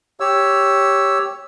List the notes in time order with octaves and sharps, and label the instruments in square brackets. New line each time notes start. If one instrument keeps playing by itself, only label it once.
[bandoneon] G4 C#5 E6